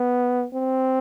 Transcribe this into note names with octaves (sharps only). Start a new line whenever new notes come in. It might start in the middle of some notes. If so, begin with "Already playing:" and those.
Already playing: B3
C4